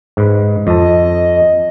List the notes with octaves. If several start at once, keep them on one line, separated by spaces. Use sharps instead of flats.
G#2 B4
F2 D#5 A5